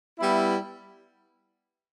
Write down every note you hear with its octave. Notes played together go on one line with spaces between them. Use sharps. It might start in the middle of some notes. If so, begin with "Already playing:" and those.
G3 B3 E4